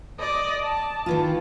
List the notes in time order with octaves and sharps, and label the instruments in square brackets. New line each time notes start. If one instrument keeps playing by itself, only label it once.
[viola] D5 D#5
A5
[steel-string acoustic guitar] D#3 E3 F4